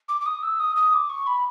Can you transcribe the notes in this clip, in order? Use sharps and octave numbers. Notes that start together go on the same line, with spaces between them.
D6
D6
D#6
E6
D#6
D#6
D6
C#6
B5